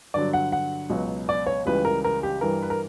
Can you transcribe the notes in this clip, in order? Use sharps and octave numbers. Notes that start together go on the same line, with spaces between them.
G2 D3 F#3 D5
F#5
F#5
C#2 B2 F#3
D5
C#5
C#2 C#3 E3 G3 B4
A#4
A#4
G4
G2 E3 G3 A#4
B4
A#4